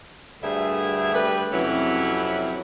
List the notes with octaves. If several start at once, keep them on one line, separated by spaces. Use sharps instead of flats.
D2 G2 D3 A3 G#4 E5
G3 A3 G4 B4
F2 C3 E3 F#3 C#4 E4